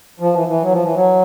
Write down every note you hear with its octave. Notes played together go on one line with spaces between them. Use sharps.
F3
E3
E3
F#3
F3
E3
F#3